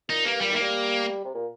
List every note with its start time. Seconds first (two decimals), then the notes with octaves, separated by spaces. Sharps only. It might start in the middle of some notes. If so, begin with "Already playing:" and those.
0.09 A#2 D#4
0.25 G2 A#3
0.41 A#2 G3
0.51 D#3 A#3
0.61 G3
1.25 C3
1.35 A#2